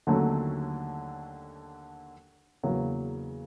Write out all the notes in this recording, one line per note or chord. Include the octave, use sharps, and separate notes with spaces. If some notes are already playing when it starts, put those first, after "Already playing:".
D#2 D3 F#3 A3 C#4
E2 C#3 F#3 A#3